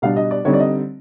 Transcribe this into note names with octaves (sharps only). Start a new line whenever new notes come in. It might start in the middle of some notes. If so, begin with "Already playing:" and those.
B2 G3 B3 D4 F5
D#5
D5
D3 G3 C4 D#4 C#5
D5
D#5